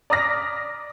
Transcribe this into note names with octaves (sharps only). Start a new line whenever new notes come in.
D5 A#5 D#6 F6 A#6 B6